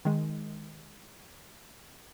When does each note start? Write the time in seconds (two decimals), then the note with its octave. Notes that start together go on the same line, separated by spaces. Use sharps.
0.05 D#3 G#3